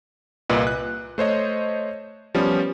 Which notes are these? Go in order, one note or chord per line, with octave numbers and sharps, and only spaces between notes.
C2 A#2 B4 D#5
F#6
A3 C5 C#5 D#5
F3 G3 B3 C#4